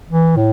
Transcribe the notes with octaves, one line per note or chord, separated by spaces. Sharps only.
E3
A2